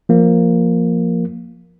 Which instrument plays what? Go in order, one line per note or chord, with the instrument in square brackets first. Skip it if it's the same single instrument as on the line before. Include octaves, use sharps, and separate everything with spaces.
[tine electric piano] F3 A#3